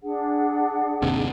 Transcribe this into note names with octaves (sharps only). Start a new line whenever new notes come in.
D4 G#4 F#5
G1 D#2 C3